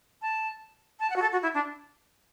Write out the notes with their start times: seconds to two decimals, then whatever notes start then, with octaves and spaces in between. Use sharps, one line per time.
0.22 A5
1.00 A5
1.10 F#5
1.16 F#4
1.22 A4
1.32 F#4
1.43 E4
1.54 D4